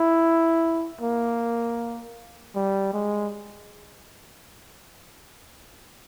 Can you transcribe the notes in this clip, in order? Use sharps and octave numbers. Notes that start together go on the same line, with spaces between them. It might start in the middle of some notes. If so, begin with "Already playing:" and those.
Already playing: E4
A#3
G3
G#3